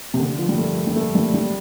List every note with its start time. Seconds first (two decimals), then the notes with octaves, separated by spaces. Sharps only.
0.14 C3
0.19 D3
0.38 F3
0.49 G3
0.58 A3
0.87 G3
0.96 A3
1.15 G3
1.34 G3